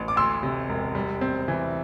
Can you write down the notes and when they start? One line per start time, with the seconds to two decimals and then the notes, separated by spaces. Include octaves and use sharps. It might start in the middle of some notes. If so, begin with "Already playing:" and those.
Already playing: A1
0.08 D6
0.16 D2 C6 E6
0.43 C3
0.69 E1
0.95 G3
1.21 C4
1.48 E3